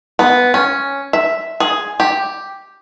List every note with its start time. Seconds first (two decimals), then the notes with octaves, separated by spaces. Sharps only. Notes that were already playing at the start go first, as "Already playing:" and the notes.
0.19 B3
0.54 C#4
1.13 E5
1.60 G#4
2.00 G4